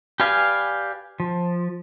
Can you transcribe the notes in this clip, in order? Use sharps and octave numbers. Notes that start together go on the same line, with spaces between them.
G4 B4 D5 F5 G#5
F3